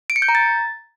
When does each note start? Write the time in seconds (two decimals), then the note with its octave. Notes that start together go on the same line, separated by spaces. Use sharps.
0.10 D7
0.16 C#7
0.22 G6
0.28 A#5
0.35 A6